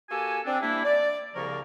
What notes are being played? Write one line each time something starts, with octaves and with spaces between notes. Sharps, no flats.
A#3 F#4 G4 A4 G#5
C4 D4
G3 A#3 D4 E4
D5
C2 C#3 F3 A#3 A#4 C#6